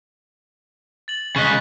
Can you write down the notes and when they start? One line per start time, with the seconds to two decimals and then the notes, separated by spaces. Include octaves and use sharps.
1.08 A6 F#7
1.36 C#3 D#5 C#6 F#6 B6